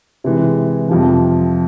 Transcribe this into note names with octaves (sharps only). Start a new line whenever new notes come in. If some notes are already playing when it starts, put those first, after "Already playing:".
C3 E3 G#3
F2 C3 F3